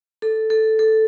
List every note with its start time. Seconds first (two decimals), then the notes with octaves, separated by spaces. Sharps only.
0.22 A4
0.50 A4
0.79 A4